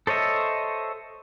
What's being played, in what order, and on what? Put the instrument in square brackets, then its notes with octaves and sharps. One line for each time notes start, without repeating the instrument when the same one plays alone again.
[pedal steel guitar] A4 C5 C#5 D#5 E5